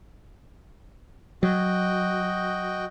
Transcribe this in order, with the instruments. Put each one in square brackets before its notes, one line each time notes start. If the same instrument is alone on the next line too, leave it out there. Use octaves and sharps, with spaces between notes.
[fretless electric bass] F#3 [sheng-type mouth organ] F#4 D#5 G5